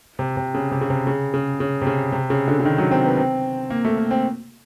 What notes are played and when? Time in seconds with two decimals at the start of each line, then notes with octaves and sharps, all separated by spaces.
0.19 C3
0.37 C3
0.54 C#3
0.71 C3
0.81 C#3
0.90 C3
1.07 C#3
1.34 C#3
1.60 C#3
1.81 C3
1.87 C#3
2.12 C3
2.30 C#3
2.48 D3
2.59 D3
2.65 D#3
2.78 F#3
2.91 C4
3.05 B3
3.17 C4
3.70 A#3
3.85 A3
3.98 A#3
4.11 C4